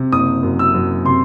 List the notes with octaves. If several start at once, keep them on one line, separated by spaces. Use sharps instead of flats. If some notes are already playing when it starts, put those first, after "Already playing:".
Already playing: C3
F#1 D#6
F#2
E6
F#2
C3 C6